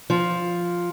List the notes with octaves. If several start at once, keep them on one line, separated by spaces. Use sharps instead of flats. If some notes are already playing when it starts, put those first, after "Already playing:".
F3